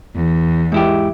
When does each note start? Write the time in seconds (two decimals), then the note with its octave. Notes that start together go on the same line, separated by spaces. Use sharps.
0.15 E2
0.72 G#2 E4 G4